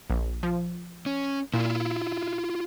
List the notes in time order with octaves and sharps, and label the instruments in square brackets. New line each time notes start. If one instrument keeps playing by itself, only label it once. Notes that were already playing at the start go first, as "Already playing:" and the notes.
[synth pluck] A#1
F3
[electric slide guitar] C#4
[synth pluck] A#2 [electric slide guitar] E4 F4